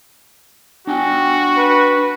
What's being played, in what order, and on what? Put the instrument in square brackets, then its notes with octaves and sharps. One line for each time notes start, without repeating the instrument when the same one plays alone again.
[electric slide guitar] D4 G5 G#5 [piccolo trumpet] F#4
[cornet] B4